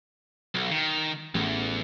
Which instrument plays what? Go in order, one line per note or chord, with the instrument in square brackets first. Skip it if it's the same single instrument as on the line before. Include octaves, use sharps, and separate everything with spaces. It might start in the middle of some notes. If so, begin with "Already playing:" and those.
[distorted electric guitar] B1
D#3
[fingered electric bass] A1 [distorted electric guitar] E2